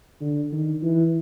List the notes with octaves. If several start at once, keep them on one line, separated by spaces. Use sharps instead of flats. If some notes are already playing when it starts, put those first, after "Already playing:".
D3
D#3
E3